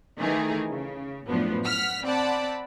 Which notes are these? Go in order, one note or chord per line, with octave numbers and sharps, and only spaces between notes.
D#3 E3 A3 D#4 G#4 A#4
C#3
F#2 A2 F3 B3 D4
F#5 F6 B6
C4 D5 F#5 A5 B5